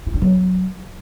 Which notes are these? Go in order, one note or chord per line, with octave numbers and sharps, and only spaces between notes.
E4
D4
F#3